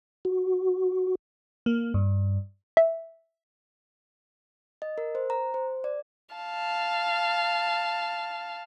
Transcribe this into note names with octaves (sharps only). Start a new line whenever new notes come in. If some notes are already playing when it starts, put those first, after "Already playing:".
F#4
A#3
G2
E5
D#5
A#4
C5
A#5
C5
D5
F5 A5